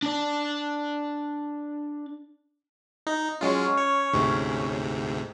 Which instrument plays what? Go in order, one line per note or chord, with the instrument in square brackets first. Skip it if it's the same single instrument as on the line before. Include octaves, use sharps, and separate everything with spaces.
[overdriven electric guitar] D4 D5
[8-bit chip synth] D#4
[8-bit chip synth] F#3 G#3 F4 [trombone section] C#4
[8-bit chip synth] C#5
D2 G#2 C3